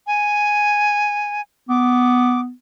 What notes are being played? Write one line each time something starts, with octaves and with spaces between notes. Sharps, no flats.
G#5
B3 D6